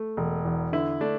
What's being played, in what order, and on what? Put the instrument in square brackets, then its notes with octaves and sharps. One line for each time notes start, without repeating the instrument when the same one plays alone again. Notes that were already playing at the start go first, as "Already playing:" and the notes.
Already playing: [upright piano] A3
E1
E2
[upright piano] D3 [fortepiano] E4
[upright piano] A3 [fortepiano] D4